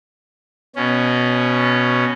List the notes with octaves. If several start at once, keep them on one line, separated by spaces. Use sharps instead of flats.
B2 C#4